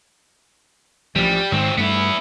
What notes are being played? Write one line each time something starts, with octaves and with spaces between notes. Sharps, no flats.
A1 F3 G3
G#2 D#3 F#3 C4
G2 A3 B3 E4